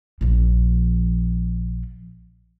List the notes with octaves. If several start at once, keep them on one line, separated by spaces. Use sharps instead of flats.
A#1 F3